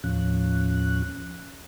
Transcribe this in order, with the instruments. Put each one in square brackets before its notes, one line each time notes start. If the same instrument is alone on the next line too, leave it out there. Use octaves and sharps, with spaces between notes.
[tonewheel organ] D#2 A2 F3 C#4 F#6